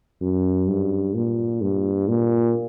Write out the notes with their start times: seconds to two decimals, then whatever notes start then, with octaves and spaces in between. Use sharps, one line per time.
0.21 F#2
0.68 G2
1.14 A#2
1.61 G2
2.08 A#2